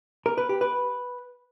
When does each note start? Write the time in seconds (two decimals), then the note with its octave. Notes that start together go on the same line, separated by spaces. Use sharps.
0.26 A#4
0.38 B4
0.49 G4
0.61 B4